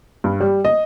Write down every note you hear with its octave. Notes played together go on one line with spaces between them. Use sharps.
G2
G3
D#5